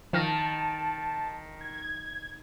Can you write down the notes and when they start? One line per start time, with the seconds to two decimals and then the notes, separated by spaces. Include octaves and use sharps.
0.13 D#3 F3 F5 A5 A#6
1.61 G#6